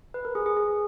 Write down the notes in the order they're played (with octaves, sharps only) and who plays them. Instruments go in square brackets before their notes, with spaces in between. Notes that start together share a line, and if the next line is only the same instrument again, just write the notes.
[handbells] B4
A#4
G#4
G#4
G#4